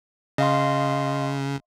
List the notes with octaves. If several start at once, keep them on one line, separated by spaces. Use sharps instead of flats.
C#3 D#5 F5 C6